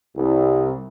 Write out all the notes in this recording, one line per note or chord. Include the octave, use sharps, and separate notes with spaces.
C2